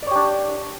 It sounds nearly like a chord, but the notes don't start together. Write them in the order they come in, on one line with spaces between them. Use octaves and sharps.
D5 C#5 G4 D4